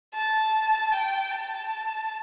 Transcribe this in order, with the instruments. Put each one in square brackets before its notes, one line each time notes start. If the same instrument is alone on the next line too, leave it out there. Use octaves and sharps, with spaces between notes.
[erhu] A5
G5
A5